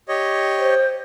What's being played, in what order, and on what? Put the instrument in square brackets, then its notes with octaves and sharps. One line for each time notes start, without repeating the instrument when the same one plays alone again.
[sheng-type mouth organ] G4 C#5 D#5
[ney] C5